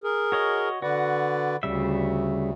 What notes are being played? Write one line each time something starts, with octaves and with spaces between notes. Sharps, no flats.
G#4 A#4
F#4 C#5 D#5
D3 F#4 B4 D5
D2 C#3 G3 E5